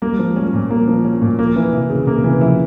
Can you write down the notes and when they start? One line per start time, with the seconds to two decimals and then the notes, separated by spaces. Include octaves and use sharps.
0.02 G3 A#3
0.13 G3
0.19 F3
0.25 G#3
0.36 G3 C#4
0.47 F3
0.53 A#2
0.59 G3
0.70 A#3
0.88 F3
1.04 G3 C#4
1.22 A#2
1.38 F3 A#3
1.56 E3
1.73 C3 E4
1.90 C#3
2.07 A#2 A#3
2.18 C3
2.24 E3
2.29 C#3
2.41 F3 E4